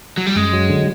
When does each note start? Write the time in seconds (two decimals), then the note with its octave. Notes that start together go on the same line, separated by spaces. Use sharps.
0.18 F#3
0.26 G3
0.36 F#2 G#3
0.53 F#3
0.70 D3